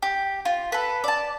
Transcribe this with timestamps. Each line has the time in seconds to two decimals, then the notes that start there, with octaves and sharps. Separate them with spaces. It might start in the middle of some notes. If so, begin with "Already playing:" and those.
0.02 G4
0.45 F4
0.72 A4 B4
1.04 D5 A5